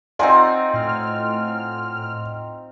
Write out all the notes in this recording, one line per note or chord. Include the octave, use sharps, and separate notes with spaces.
C4 D#4 F4 D5 F#5 G#5
A2 F6